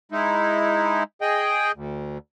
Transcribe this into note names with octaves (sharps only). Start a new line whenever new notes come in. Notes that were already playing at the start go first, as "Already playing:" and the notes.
G#3 D#4 E4
G#4 D#5 G5
D2